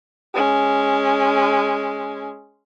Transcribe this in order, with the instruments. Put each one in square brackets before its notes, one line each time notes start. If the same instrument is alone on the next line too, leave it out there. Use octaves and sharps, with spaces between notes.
[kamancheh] G#3 C#4